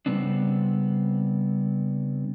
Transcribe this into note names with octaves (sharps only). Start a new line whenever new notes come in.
C#3 G3 B3 C4 D4